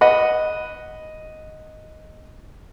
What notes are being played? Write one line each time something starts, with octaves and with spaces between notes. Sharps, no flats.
D#5 F#5 B5